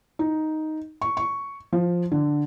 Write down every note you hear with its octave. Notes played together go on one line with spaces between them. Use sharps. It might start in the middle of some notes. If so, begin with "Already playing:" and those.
D#4
C#6
C#6
F3
D3